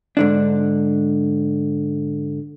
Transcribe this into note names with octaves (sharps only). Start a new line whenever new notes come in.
G#2 D3 D4